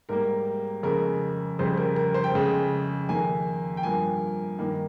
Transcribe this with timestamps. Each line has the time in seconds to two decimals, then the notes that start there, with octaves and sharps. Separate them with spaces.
0.09 G#2 G3 A#3 A#4
0.83 F2 C#3 G#3 A#4
1.59 F2 C#3 G3 C5
1.77 A#4
1.96 A#4
2.14 C5
2.24 G5
2.33 F2 C#3 G#3
3.09 F2 D#3 A#3 G#5
3.77 G5
3.83 G2 F3 A#3 G#5
4.58 G2 D#3 A#3